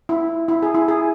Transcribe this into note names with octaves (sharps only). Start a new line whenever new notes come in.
E4
E4
G#4
E4
G#4